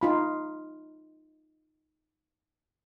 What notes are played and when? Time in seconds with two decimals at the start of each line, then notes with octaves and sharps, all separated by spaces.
0.01 D#4 F4 B5